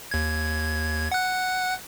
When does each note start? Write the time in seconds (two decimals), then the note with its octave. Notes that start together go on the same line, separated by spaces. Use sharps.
0.11 D#2 G#6
1.12 F#5 F#6